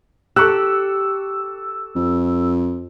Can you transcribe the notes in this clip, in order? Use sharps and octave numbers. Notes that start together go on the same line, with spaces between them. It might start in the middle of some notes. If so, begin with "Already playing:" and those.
G4 A4 C#6 E6 F#6
F2